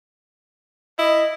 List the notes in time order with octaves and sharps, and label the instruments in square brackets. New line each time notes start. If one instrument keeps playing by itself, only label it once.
[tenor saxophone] E4 [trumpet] D#5